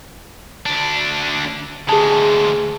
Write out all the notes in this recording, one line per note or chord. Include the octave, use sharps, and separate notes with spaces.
D2 D4
D2 G#3 G#4 A5